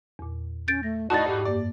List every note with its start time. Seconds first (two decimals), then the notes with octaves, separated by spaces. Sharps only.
0.19 E2 A#2
0.68 C#4 G6 A6 D7
0.83 A3 A#6
1.10 A2 D#4 F#4 D5 D#5 A5 A6
1.28 G#2 G4
1.45 F#2 A#3 D5